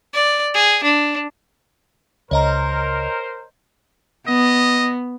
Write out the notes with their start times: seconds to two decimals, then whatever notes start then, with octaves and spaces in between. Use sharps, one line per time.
0.14 D5
0.54 G#4
0.84 D4
2.31 C#2 A#4 C5 C#5 D#5 A#5
4.27 B3 D#5